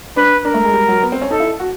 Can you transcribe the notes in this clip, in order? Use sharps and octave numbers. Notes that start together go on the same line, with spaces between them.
D4 B4
D4 A#4
A3
G#3
G3
F#3
B3
C4
C#4
D#4 A4
E4
F#4